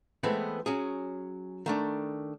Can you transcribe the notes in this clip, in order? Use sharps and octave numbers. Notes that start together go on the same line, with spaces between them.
E3 G#3 A3 B3 C4
F#3 C#4 G#4
D#3 A3 D4